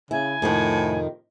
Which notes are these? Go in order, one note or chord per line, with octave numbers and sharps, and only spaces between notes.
C#3 E4 G#5
F2 A2 C3 D#3